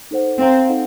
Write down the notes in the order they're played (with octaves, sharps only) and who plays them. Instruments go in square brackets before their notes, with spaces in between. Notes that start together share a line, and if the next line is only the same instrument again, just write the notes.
[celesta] D#4 A4 C5 F#5
[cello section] C4 [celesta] C5 F5 A#5
[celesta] D#4 A4 D#5 F#5